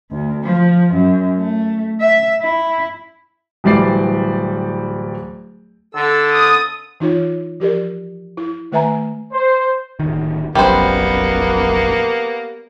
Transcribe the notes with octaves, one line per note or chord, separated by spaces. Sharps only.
D2
F3
F#2
A3
E5
E4
D1 E3 G3 D5 C7
D3 A4 E6
D#6
E3 D#4 F4 C#5
F3 G4 A#4 D5
E4
D#3 A3 B4 E5 G#5 A#5
C5
D1 D#3
F1 A#1 F#2 G3 A#3 B3 C5